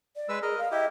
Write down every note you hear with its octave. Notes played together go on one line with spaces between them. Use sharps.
D5
G#3 B4 E6
G#4 A#4 D#5
F5
E4 G4 D#5